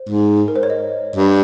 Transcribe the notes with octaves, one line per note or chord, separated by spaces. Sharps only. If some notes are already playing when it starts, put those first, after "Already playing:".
Already playing: C5
G#2
A#4
C5
C#5
D#5
G2